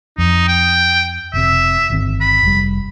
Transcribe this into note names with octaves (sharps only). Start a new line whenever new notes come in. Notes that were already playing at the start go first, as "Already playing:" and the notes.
F2 D#4
G5
F1 C3 E5
G1 D#3 C4
B5
F1 G3